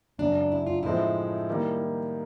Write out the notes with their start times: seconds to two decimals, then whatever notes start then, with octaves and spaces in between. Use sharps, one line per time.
0.18 G#1 F#2 C#3 F#3 D4
0.52 E4
0.67 F4
0.83 A2 F3 G#3 C4 E4
1.50 D#3 G3 A#3